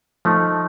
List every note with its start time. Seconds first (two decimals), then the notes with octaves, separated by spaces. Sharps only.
0.25 F3 A3 D#4